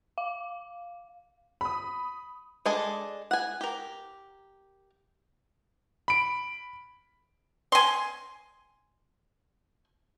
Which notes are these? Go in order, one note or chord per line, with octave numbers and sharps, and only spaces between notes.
F5
B5 D#6
G#3 D4 A4 D#5 G#5
F#5 G#5
G4 A#4
B5 D7
G#5 C6